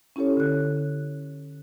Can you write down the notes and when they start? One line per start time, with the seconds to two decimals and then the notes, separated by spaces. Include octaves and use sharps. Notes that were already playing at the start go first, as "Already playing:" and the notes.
0.16 C#4 E4 G4 A4 C#5
0.37 D3 F#6